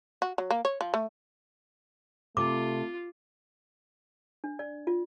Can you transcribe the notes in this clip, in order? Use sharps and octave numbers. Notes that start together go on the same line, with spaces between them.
F#4
F#3
A#3
C#5
F3
A3
C3 A3 F4 D6
D4
D5
F4